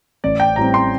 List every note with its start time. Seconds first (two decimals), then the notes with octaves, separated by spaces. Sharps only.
0.24 A1 D5
0.40 G5
0.56 A2 G3 C4 A#5
0.74 C6